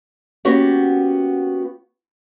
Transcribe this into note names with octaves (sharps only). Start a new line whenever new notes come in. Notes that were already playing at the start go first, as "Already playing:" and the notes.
A#3 B3 C#4 F#4 G4